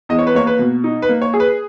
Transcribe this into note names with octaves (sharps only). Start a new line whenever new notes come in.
E2 D#5
C#5
B4
A#3 C#5
B4
B2
D#4
B4
A#3
C#5
G#4
B4